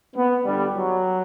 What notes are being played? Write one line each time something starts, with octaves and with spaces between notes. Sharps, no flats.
B3
G1 G2 D3 G3
F#3